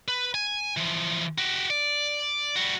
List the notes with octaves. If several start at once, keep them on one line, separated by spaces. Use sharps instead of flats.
B4
G#5
E3 F3
F#4 G4
D5
G3 F#4